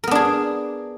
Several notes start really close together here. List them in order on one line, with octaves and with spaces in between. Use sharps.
A#4 B3 D4 G#4